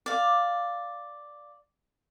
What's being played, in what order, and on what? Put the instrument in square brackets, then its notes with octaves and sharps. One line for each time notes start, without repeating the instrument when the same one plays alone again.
[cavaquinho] D5 F5